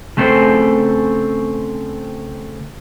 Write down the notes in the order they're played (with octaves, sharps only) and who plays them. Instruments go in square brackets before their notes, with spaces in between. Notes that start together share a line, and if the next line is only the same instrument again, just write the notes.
[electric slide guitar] C#3 A3 C4 G#4 A4 C5